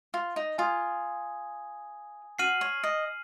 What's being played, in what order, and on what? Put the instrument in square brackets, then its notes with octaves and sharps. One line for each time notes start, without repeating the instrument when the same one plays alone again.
[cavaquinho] F4
D#4
[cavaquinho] F4 [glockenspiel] G#5 D#6 G#6
[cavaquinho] F#4 [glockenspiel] F6 C7 D#7 F#7
[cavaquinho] C#5
D#5